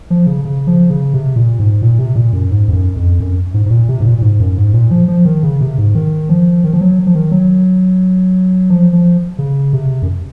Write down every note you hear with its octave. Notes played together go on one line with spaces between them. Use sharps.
F3
C#3
C#3
F3
C#3
C3
A#2
G#2
A#2
C3
A#2
F#2
G#2
F2
F#2
F2
F#2
G#2
G#2
A#2
C3
G#2
A#2
A#2
G#2
F#2
G#2
A#2
F3
F3
D#3
C#3
C3
G#2
D#3
F3
D#3
F3
F#3
F3
D#3
F#3
F3
F3
C#3
C3
F#2